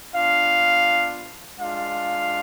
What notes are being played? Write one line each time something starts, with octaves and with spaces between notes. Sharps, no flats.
B3 D4 F4 F5
G#3 D4 F4 F5